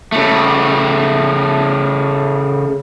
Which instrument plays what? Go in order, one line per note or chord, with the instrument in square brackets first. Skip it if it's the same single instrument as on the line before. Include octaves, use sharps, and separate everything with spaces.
[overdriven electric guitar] C#3 A3